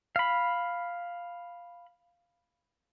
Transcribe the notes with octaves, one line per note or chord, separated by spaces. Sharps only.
F5 B5